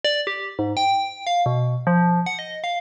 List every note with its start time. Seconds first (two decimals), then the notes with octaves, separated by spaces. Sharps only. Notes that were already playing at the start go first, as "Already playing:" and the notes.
0.05 D5
0.27 G4
0.59 G#2
0.77 G5
1.27 F5
1.46 B2
1.87 F3
2.26 F#5
2.39 D#5
2.64 F5